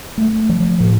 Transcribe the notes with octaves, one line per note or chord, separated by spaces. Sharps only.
A3
F3
A2